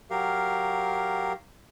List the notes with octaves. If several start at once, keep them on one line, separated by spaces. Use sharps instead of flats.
F#3 G4 A#4 F5